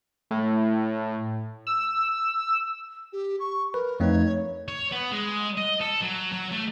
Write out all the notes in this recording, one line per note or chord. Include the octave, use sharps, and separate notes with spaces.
A2
E6
G4
C#6
A#4 B4
F2 A3 D#4 C#5
C#5
B3
G#3
D#5
A4
F#3
F#3
A3